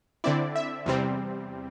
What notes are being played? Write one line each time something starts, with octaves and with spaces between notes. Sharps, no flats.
D3 C4 E4 D5
E5
E2 C3 G3 C4